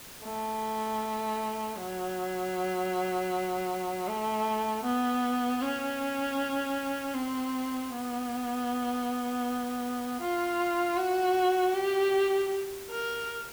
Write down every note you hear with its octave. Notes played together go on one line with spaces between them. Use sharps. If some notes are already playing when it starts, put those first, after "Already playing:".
A3
F#3
A3
B3
C#4
C4
B3
F4
F#4
G4
A#4